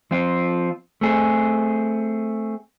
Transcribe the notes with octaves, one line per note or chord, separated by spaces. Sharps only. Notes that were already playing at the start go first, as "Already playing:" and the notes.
F3 C4 F4
A3 C4 G#4